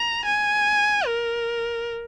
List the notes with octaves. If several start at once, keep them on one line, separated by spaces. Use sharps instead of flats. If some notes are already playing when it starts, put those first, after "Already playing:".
Already playing: A#5
G#5
A#4